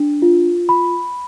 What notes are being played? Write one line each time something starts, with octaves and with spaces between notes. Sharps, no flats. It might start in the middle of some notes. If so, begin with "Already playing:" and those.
Already playing: D4
F4
B5